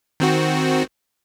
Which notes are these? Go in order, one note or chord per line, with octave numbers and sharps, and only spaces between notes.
D#3 C4 F#4